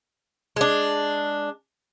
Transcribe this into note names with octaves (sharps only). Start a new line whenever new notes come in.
G#3 D4